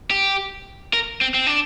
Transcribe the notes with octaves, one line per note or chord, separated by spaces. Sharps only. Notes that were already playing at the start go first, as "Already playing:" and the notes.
G4
A#4
C4
C4
D4